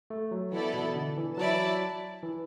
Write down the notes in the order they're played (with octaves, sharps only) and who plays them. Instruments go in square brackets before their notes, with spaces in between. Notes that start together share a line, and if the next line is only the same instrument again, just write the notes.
[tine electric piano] A3
F#3
[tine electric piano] E3 [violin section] B3 E4 A4 D5
[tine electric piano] B2
D3
E3
[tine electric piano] F#3 [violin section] E4 D5 A5
[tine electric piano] E3